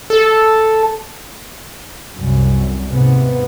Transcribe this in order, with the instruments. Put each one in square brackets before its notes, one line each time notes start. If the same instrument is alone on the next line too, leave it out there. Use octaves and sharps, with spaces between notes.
[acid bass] A4
[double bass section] C2 F#2
D#2 G#2 C3 B3